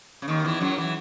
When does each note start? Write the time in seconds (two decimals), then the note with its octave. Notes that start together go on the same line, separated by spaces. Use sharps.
0.22 C#3
0.28 D#2 D#3
0.45 E2 E3
0.61 F#2 F#3
0.78 E3